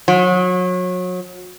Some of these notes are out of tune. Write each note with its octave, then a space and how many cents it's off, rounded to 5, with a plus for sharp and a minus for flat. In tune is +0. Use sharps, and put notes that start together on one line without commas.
F#3 -30